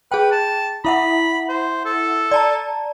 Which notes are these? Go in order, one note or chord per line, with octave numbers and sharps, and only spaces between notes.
G#4 B4 G5
A5
E4 E5 F#5 B5
C5
A4
D5 A5 A#5